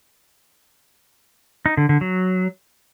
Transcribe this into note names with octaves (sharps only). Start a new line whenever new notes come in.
D#4
D3
D3
F#3